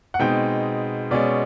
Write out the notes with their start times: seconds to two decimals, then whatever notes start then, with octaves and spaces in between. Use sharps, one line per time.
0.14 F#5
0.19 B2 G#3 C4 D#4 G5
1.11 B2 G#3 C#4 D5